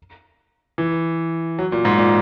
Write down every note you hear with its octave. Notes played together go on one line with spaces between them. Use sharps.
E3
F#3
A#2
G#2
A#2